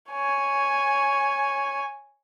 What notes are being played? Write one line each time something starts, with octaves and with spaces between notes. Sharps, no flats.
C#5 G#5